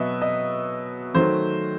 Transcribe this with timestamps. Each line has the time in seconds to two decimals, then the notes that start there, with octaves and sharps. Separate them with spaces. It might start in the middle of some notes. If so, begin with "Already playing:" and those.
Already playing: B2 F#3 B3 B4 D#5 E5
0.22 D#5
1.14 D#3 F#3 A3 C5